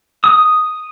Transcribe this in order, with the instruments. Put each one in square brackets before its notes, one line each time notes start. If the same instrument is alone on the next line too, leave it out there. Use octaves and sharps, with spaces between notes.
[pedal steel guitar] D#6